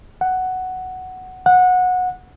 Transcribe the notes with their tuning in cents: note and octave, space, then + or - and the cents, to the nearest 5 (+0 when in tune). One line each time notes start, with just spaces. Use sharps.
F#5 +5
F#5 -20